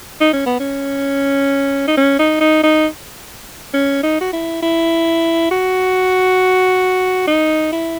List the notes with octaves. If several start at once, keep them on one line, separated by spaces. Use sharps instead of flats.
D#4
C#4
B3
C#4
D#4
C#4
D#4
D#4
D#4
C#4
D#4
F#4
E4
E4
F#4
D#4
E4